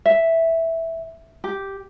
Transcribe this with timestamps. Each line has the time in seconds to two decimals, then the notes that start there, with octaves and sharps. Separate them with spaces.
0.06 E5
1.44 G4